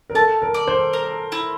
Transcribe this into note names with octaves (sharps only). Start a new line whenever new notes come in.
A#4
A4 A5
A#4
D5
C5
A#4
E4